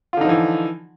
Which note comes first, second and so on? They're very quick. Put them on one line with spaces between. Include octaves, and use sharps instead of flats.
F4 D3 D#4 F3 E3